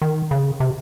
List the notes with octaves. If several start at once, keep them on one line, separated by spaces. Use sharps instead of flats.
D#3
C#3
C3